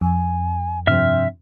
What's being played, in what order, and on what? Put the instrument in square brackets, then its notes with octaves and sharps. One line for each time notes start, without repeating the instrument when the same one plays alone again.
[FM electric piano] F2 [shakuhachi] G#5
[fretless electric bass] G2 C3 F3 [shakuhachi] C4 [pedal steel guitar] E5 F6